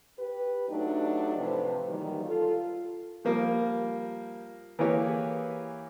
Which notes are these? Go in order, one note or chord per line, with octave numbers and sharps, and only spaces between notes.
G4 B4
F#3 A3 D4 D#4 G4
A2 C3 F3 B4
D#3 E3 F#3 G3 A#3
F4 A4
F3 G3 A#3
E3 A#3 G4 G#4 B4 C#5